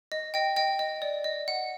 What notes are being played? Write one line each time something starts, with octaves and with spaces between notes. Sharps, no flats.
D#5
D#5 G5
D#5 G5
D#5
D5
D#5
F#5